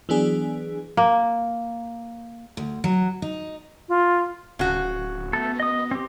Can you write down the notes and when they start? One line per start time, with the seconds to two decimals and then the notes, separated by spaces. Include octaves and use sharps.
0.09 E3 F#3 B3 D4 G#4
0.97 A#3
2.57 D2
2.84 F#3
3.22 D#4
3.89 F4
4.59 D1 C#3 F#4
5.33 A3 B3 A4
5.60 D#5 D#6
5.91 C4 G4